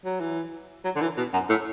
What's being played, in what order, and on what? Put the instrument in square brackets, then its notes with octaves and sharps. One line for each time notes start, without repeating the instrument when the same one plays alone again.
[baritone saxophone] F#3
E3
F#3
D3
E3
B2
F#2
A2